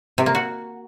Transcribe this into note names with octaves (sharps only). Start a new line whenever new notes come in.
C3
A#3
F#4